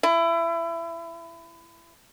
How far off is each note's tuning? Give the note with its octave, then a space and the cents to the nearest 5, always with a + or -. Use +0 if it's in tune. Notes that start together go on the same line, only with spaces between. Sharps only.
E4 +25